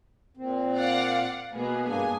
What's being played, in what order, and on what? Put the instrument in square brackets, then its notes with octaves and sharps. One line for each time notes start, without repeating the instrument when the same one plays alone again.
[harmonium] A#2 C4
[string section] D5 F5 F#5
[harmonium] B2 [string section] A#3 B3 G#4
[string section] G2 G#5 [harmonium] A#3 D4 G#4